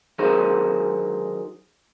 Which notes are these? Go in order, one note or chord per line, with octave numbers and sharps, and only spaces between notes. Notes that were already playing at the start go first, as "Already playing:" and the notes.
D3 D#3 F#3 G#4 A#4 C5